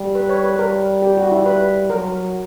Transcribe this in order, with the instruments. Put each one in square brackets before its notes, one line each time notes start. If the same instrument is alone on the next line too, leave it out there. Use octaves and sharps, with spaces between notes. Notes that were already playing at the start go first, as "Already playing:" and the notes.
Already playing: [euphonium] G3
[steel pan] B4
C#5
B4
[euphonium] G3 [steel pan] A#4
[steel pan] G4
F#4
E4
B4
[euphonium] F#3 [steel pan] A#4